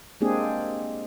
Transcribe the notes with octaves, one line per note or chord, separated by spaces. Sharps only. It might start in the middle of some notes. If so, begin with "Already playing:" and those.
G#3 A#3 C4 D4 G4 G#4